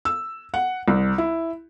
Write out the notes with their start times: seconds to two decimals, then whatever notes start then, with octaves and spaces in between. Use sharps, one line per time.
0.05 E6
0.54 F#5
0.88 C2
1.18 E4